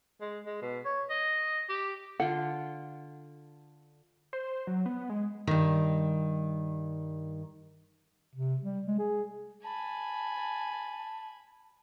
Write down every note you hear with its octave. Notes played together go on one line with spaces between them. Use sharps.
G#3
G#3
B2
C#5
D#5
G4
D3 F4 F#5 G5
C5
F#3
B3
G#3
G2 D#3
C3
G3
G#3
G#4
G#5 A5 B5